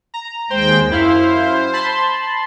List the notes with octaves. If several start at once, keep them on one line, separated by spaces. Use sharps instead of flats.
A#5
D#2 G#3 C5 G5
F#2 E4 C5 F5
A5 B5 C6